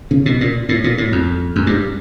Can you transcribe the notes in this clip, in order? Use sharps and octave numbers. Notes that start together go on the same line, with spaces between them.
C#3
B2
A#2
A2
A#2
A2
F2
F#2
G2